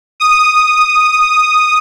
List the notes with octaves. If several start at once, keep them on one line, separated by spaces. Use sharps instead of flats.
D#6